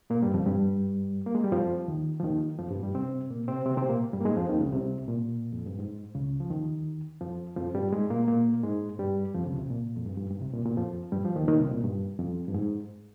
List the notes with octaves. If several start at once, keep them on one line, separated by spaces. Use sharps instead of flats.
A#2 A#3
G2 G3
F2 F3
G2 G3
A#3
G#3
G3
F2 F3
D#2 D#3
F3
D#2 D#3
F2 F3
G2 G3
G2 G3
C3 C4
A#2 A#3
C3 C4
C3 C4
C3 C4
A#2 A#3
G2 G3
A#3
G#2 G#3
F2 F3
D#2 D#3
C#2 C#3
C2 C3
A#2
F2
G2
G#2
C#2 C#3
F3
D#2 D#3
F2 F3
F2 F3
G2 G3
G#2 G#3
A#2 A#3
A#2 A#3
G#2 G#3
G2 G3
F2 F3
C#2 C#3
C2 C3
A#2
F2
G2
G2
G2
C2 C3
A#2
A#2
F2 F3
G2 G3
F3
D#2 D#3
D#2 D#3
C2 C3
A#2
G2
F2
G2
G#2